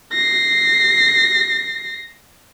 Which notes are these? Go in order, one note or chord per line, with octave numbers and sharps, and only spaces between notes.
A#6 C7